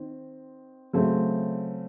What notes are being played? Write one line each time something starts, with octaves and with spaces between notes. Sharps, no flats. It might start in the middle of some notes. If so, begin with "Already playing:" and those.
Already playing: D#3 C4
C#3 F#3 A3 C4